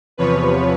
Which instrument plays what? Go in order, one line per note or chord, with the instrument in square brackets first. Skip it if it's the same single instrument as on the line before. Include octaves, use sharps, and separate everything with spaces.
[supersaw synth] E2 C3 F3 B4 C#5